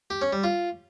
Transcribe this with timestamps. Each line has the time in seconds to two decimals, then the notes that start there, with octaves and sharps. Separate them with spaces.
0.10 G4
0.21 C#4
0.33 G3
0.44 F4